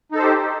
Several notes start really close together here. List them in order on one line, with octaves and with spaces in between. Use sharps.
D#4 A4 C5 G4